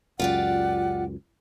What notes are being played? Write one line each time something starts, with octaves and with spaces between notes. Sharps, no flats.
C#2 F#2 F4 G4 D5 F#5